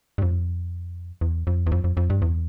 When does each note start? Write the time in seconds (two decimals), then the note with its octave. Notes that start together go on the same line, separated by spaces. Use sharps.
0.18 G2
0.22 F2
1.21 E2
1.47 F2
1.66 E2
1.72 F2
1.84 F2
1.97 F2
2.10 G2
2.22 E2